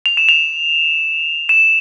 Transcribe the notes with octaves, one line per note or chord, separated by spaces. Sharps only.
F7
E7
F7
E7